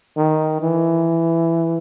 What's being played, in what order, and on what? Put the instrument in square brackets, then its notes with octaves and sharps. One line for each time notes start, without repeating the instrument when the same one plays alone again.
[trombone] D#3
E3